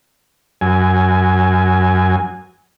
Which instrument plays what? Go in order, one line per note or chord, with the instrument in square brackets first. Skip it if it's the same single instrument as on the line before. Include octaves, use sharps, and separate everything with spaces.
[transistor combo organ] F#2 G#5